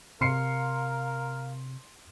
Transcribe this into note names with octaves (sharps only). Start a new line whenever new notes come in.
C3 A#4 F5 C6 C7 C#7